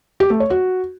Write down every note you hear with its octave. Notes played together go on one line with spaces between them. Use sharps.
G4
A3
C#5
F#4